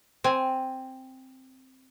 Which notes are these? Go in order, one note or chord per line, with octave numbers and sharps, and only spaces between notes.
C4 G#5